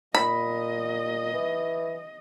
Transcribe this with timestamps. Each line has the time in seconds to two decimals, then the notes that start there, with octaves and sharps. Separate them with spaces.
0.15 A#2 D#5 B5
1.33 E3